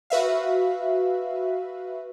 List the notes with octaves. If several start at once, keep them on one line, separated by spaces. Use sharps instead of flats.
F#4 B4 E5 F5